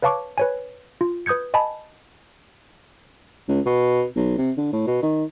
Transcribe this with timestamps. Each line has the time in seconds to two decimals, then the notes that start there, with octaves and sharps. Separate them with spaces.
0.02 B4 C#5 F5 A5 C#6 D6
0.38 B4 C#5 G#5
1.01 F4
1.26 B4 D#6 G6 G#6 C#7
1.54 D#5 G#5 A5 B5
3.48 C#2
3.66 B2
4.16 B1
4.38 C3
4.57 D3
4.73 A2
4.87 B2
5.02 D#3